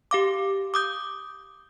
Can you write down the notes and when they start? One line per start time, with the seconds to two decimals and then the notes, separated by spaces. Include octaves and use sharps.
0.11 G4 F5 D6
0.74 D6 D#6 G6